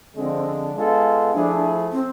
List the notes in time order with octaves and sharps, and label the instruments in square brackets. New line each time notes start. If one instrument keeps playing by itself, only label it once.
[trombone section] D3 F3 G#3 D4 [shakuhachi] C4
[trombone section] G#3 B3 F4 A4
[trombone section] F3 A3 E4 G#4 [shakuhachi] D4
[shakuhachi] C4